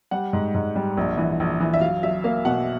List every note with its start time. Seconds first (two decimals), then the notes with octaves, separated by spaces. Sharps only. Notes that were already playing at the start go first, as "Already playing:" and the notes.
0.11 G3 F#5
0.33 G#2
0.55 G#2
0.75 G3
0.97 A#1
1.18 E3
1.40 A#1
1.60 E3
1.74 E5
1.81 F#3 F5
2.03 F#3 E5
2.24 A#3 F5
2.45 B2 F#5